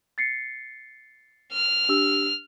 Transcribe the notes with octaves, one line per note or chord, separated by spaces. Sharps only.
A6 C7 C#7
F6
D4 G4 E6